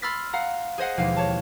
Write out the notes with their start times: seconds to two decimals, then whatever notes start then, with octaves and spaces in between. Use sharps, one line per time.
0.02 B5 C6 E6 F6 A6 B6
0.33 F5 F#5 A#5
0.78 G#4 C5 D#5 F#5
0.97 E1 D#2 F3 F5
1.17 C#5 A5